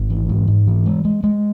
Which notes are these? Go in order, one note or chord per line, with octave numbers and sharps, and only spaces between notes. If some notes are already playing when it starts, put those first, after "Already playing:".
Already playing: G#1
E3
G#2
G#2
E3
G#3
G#3
G#3